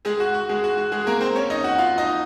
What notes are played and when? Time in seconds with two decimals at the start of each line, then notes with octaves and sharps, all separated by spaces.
0.05 G#3 G#4
0.20 F#4
0.34 F#4
0.49 G#3 G#4
0.64 F#4
0.78 F#4
0.92 G#3 G#4
1.07 A#3 A#4
1.21 C4 C5
1.36 C#4 C#5
1.50 D#4 D#5
1.64 F#4 F#5
1.78 F4 F5
1.98 D#4 D#5